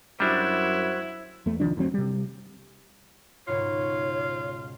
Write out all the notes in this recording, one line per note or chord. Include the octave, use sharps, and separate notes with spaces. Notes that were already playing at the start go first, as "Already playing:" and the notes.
F#2 G3 D4 E4 F#4 C5 G#6
E2 A3
C2 D#3 F3 D4
G1 D2 F#3 C4
C3 G3
C#2 G#2 B2 F4 C#5